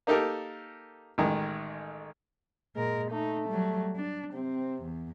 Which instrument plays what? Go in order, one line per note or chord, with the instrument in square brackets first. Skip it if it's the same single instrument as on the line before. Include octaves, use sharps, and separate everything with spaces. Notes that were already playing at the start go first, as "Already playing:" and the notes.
[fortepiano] A#3 D#4 G4 A4 A#4
A1 D#3 G#3
[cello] A#2 A#4 [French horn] G#3
[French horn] A3 [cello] D#4
[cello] F#3 G3
D4
[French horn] C3 [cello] C4
[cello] E2